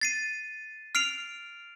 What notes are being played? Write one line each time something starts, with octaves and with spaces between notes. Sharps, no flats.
A6 C7 D#7
F6 C7 D7 F7